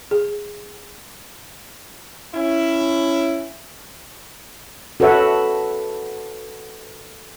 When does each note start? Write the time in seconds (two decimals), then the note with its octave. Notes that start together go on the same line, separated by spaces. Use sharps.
0.11 G#4
2.34 C#4 E4
5.00 F#4 A4 B4 C#5 E5 F#5